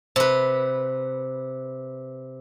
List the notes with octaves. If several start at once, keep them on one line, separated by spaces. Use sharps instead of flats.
C3 B4